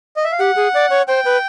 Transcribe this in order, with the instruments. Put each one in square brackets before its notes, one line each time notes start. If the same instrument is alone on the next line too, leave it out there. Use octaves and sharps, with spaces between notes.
[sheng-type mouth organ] D#5
E5
F5
[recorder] G4 [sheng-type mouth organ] F#5
[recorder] G#4
D5
C#5
[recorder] C5 [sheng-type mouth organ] G5
[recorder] B4